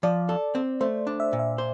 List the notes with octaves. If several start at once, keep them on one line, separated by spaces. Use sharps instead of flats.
F3 D5
A4
C4
A3 C5
D4
E5
A#2
E5
C5